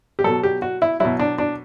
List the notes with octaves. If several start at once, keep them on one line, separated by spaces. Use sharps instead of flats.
G4
B2 F#3 A4
G4
F#4
E4
B2 F#3 E4
D4
D4